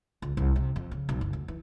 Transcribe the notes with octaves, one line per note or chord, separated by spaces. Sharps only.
C#2
C2
C3
F2
C#3
B1
F#1
D2
E3